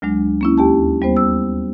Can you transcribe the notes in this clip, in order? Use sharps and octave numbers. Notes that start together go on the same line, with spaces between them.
D2 F#3 G#3 D4
A#3 C#4 E4
D#2 G4 A5
G3 B3 C5
E6